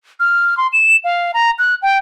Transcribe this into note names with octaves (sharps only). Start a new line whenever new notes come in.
F6
C6
E7
F5
A#5
F#6
G5